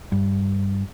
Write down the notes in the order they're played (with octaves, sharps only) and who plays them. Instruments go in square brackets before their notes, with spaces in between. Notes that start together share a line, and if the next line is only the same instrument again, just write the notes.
[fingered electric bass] G2